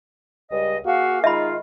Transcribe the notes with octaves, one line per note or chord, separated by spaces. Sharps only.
C#2 G3 D#5
A#3 F#4 G#4 F5
D#3 G#3 D#4 F4 E5 B5